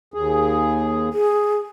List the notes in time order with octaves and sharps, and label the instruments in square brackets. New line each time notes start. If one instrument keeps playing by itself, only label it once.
[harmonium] D#2 G#4
[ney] G#4